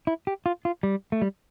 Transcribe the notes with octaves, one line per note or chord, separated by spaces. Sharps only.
E4
G4
F4
F4
G3
A3
G3